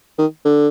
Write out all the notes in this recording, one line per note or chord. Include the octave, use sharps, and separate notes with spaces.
D#3
D3